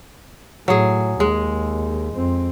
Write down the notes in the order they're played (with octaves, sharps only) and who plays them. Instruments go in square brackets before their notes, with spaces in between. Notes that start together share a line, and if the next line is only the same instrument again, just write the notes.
[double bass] A2 [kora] F#3 G#4
[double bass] D#2 [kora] G#3
[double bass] F2 C4